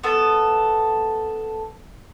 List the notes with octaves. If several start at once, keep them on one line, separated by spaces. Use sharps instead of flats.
B3 A4